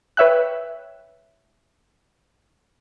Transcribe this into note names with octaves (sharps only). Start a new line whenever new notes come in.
B4 C#5 E5 G5 F#6